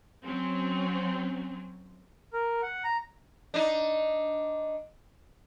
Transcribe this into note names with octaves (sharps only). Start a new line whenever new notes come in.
F#3 C4 C#4
A#4
F#5
A#5
D4 D#4